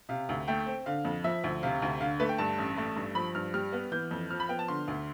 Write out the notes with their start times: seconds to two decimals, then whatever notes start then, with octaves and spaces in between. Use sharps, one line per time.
0.09 C3 F5
0.29 D2
0.48 A3 G5
0.66 C4
0.86 D3 F5
1.05 F2
1.24 F3 E5
1.44 D2
1.63 C3 F5
1.82 D2
2.01 D3 F5
2.20 A3 B4
2.29 G5
2.38 G2 A5
2.58 A1
2.78 A3
2.96 G2
3.15 F3 B5
3.35 G2 F6
3.54 G3 F6
3.73 B3
3.92 E3 G6
4.11 F2
4.31 F3 F6
4.40 B5
4.49 B3 G5
4.59 A5
4.68 D3 C6
4.88 D2